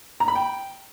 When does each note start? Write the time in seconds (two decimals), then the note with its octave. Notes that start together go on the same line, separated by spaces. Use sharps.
0.20 A#5
0.28 B5
0.35 G5